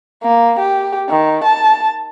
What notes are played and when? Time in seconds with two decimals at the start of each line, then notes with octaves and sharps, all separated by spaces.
0.23 A#3
0.59 G4
1.09 D#3
1.45 A5